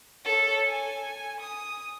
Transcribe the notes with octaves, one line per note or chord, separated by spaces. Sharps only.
A4 C#5
G#5
D#6